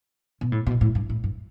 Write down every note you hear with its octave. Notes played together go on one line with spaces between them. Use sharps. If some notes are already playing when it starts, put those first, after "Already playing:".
B2
A2
B2
A2
G2
A2
G2